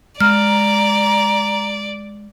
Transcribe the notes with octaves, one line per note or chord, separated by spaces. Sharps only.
G#3 D5 A#5 F6